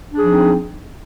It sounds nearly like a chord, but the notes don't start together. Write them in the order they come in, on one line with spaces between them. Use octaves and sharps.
D4 G#4 F3 D#4 C4